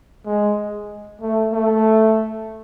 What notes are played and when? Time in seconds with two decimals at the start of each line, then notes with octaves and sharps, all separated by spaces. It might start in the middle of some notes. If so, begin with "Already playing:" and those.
0.26 G#3
1.21 A3
1.52 A3